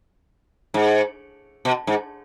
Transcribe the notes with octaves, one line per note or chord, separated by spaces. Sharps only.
G#2
B2
G#2